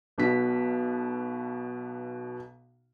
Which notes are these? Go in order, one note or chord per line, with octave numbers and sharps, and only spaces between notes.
B1 B2 B6